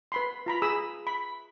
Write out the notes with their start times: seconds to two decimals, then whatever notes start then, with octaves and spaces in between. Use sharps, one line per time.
0.12 B4 B5 C6
0.46 F4 A#5 B5
0.62 G#4 B5 D#6 E6
1.07 B5